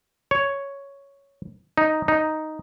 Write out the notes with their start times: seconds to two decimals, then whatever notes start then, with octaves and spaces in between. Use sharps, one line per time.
0.31 C#5
1.78 D#4
2.08 D#4